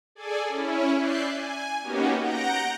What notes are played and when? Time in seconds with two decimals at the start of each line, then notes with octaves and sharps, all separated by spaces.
0.15 G#4 A4 D5 G#5
0.48 C#4 E4
0.97 D5 E5 F#6 G6 C7
1.28 G#5
1.82 A#3 B3 C#4 D#4 F#4 G4
2.19 F#5 A#5 G6 A#6 D7